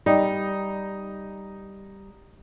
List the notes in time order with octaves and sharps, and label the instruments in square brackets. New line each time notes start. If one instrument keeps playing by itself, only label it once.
[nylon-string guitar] G3 [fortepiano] D#4